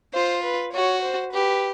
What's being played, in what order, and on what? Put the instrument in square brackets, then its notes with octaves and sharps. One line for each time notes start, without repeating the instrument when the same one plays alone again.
[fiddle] F4 [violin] C5
[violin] B4
[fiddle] F#4 [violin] C#5
[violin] C5
[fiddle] G4 [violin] B4